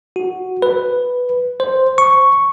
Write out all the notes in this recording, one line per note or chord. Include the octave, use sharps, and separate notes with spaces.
F#4
B4
C5
C#6